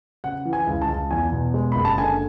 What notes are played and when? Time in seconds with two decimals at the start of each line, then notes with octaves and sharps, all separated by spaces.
0.24 C#3 F#5
0.45 E3
0.53 G#5
0.67 C#2
0.82 A5
0.89 C#2
1.11 E2 G#5
1.32 B2
1.54 G#3
1.72 F#1 B5
1.85 A5
1.98 D3 G#5